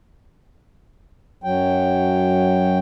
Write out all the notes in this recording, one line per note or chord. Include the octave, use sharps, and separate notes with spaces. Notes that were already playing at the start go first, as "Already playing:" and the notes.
F#2 F#3 G5